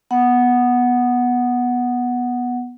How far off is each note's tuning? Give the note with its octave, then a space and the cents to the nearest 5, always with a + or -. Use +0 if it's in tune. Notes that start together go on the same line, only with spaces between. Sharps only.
B3 -10 F#5 +0